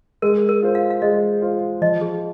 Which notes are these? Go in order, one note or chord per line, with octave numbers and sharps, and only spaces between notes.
G#3 A#4
A#4
F4 C5
F5
F5
G#3 D#5
F4 C5
F3 D#5
G#4